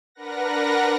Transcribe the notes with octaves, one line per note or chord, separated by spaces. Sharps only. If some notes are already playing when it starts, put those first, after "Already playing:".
D4 A#4 B4 F#5 A#6